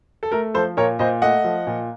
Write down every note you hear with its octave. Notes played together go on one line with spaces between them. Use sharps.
A4
A3 A#4
F3 A4 C5
A#2 A#4 C#5
A#2 C5 D#5
A3 D#5 F#5
F3
A#2